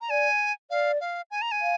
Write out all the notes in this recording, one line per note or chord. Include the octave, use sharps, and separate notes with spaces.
A#5
D5 G#5
D5 F5
F5
G#5
A#5
G#5
F5